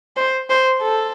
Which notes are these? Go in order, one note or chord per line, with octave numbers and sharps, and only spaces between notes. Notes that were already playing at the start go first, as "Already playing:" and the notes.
C5
C5
A4